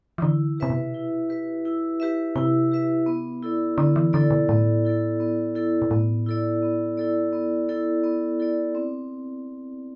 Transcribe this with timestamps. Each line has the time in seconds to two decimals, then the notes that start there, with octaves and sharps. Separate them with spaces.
0.18 E3
0.22 D3 E4
0.58 C3 G4 B4 E5
0.70 B2
0.94 E4
1.29 G4 B4 E5
1.65 E4
2.00 G4 B4 E5
2.36 C3 E4
2.72 G4 B4 E5
3.06 B3
3.43 E4 A4 D5
3.78 D3 B3
3.96 E3
4.13 D3 E4 A4 D5
4.31 B2
4.49 A2 B3
4.85 E4 A4 D5
5.20 B3
5.55 E4 A4 D5
5.82 B2
5.91 A2 B3
6.26 E4 A4 D5
6.62 B3
6.98 E4 A4 D5
7.33 B3
7.68 E4 A4 D5
8.04 B3
8.40 E4 A4 D5
8.75 C4